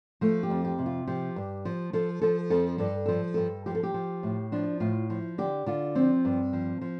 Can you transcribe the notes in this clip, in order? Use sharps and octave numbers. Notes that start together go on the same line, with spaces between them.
F3 A3
G4
F2
G4
C3
F4
F3 G4
G2
F3
F3 A4
F3 A4
F2 A4
G2 A4
F3 A4
G2 A4
F3 G4
A4
G4
F3
A2
F3 D4
A2 F4
F3
D3 G4
D3 F4
F3 C4
G2
F3
F3